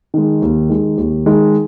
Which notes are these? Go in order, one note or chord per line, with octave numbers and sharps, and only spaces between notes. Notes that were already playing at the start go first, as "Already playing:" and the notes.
D#3 G#3
D#2
D#3 G#3
D#2
D#3 G#3